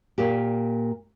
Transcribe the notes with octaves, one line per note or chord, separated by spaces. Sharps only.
A#2 A#3 G4